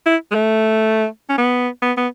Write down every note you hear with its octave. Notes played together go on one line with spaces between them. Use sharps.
E4
G#3
A3
C#4
B3
B3
B3